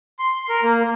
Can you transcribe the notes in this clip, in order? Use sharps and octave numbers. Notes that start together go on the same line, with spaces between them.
C6
A#4
A#3